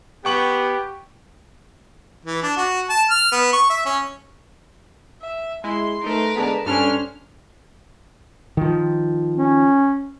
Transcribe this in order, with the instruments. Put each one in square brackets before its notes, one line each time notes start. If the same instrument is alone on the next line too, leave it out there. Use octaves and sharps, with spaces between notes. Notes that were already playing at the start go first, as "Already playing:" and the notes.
[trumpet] B3 [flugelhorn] G4 [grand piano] G5 C#6 F#7
[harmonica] E3
D4
F#4
A5
F6
B3
C#6
E5
C#4
[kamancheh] E5
[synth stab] G#3 E4 [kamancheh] C6
[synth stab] A3 D#4 [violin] A#4 B4
[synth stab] D3 G#3 B3 [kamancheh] A5
[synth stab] G2 G3 A4 [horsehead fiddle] C#4 D4 [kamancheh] C5 G#5 [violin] F6
[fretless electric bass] D#3 F3
[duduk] C#4